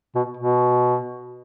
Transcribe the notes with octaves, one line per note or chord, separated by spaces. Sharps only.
B2
B2